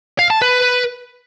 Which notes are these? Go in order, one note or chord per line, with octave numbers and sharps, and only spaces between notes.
F5
A5
B4